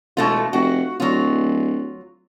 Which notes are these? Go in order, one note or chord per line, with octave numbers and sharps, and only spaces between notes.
E1 B2 A3 F4
F1 F#4
D1 F#3 F4